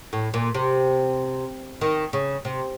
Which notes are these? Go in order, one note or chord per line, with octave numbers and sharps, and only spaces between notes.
A2
A#2
C3
D#3
C#3
C3